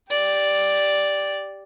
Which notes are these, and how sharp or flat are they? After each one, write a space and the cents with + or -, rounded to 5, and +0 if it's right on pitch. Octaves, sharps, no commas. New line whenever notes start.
G4 +0 D5 +0